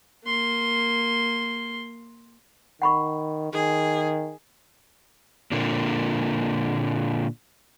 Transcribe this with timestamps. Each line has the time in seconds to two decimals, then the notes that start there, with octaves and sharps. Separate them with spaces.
0.25 A#3 C6
2.82 D#3 F#5 B5 C#6
3.53 D#3 G#4
5.52 A#2 D3 A#3